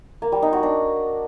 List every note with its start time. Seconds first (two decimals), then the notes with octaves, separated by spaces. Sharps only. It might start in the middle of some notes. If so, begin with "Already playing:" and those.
0.22 A#3
0.32 G3
0.42 D#4
0.53 F#4
0.63 D4